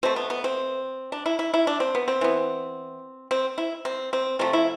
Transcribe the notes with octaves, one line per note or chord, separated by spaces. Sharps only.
B2 A3 C4
B3
B3
C4
D4
E4
E4
E4
D4
C4
B3
C4
E3 B3
C4
E4
C4
C4
C3 F3 A3 C4
E4